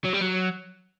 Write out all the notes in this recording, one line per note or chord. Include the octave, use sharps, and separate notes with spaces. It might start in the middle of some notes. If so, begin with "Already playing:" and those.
F#3
G3
F#3